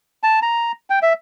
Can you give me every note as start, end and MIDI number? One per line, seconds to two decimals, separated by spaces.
0.23 0.39 81
0.42 0.72 82
0.90 0.99 79
1.02 1.13 76